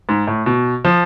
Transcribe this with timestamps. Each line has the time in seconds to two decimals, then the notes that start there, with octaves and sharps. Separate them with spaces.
0.09 G#2
0.27 A2
0.46 B2
0.85 F3